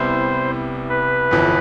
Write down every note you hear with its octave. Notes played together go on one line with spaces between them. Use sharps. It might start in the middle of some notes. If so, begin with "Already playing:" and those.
Already playing: C2 C3 G3 B3 E4 C5
B4
G1 F2 E3